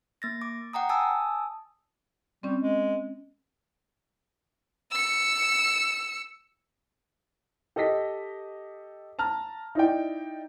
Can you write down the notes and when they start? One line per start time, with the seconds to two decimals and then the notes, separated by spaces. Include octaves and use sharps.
0.22 A#3 A6 A#6
0.42 D6
0.73 F#5 G5 A#5 D#6
0.89 G#5 A5 D#6 E6
2.43 G3 C4 C#4
2.62 G#3
4.91 E6 C#7
7.76 G4 A4 D#5 A#6 B6
9.19 A5 A#5 F6
9.75 D#4 E4 D5 G5